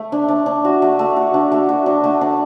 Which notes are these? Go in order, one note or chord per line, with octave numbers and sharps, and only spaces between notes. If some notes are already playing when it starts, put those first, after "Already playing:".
Already playing: A3
D4
D4
D4
F#4
A3
A3
F#4
D4
A3
F#4
D4
A3
D4